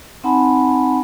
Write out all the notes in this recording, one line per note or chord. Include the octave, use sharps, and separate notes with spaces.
C4 D#4 F#5 G#5 A5 B5